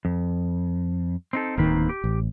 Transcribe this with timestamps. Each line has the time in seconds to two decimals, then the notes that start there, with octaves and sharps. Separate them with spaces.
0.05 F2
1.33 C4 D#4 A4
1.58 D1 D#3 A#3 C4 B4
1.89 G4
2.04 A1